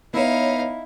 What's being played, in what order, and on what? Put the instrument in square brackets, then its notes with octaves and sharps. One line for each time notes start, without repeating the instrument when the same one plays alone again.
[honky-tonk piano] B3 C#5 [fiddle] D#4 F5 [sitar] E4